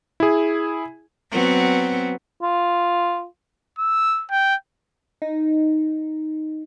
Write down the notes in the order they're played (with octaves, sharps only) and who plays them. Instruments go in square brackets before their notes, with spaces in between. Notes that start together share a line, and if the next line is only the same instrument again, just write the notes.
[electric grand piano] E4 G#4
[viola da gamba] F#3 B3 C4
[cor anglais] F4
[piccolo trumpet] E6
G5
[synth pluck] D#4